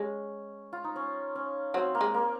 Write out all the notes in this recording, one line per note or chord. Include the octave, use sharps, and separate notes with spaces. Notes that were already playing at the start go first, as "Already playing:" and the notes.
Already playing: G#3 C#4
F4
D#4
C#4
C#4
F#3 C4
A#3
G#3
A#3